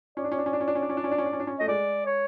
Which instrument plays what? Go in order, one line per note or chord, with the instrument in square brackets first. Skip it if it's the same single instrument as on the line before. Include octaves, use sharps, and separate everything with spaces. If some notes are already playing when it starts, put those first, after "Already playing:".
[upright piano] C#4 [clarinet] D5
[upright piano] D4
C#4
D4
C#4
D4
C#4
D4
C#4
D4
C#4
D4
C#4
D4
C#4
D4
C#4
D4
C#4
[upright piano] A3 [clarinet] D#5
[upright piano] G#3 [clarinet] D5
[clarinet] C#5